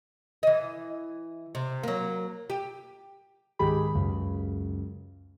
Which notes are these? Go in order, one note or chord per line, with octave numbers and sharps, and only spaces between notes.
E3 D#5
C3
F#3 A#3
G4
C#2 G#2 D#3 G4 G#4 B5
C#2 F#2 C#3